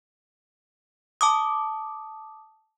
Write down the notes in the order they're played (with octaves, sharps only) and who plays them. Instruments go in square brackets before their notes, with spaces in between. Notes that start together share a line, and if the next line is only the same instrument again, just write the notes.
[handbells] A5 D6 D#6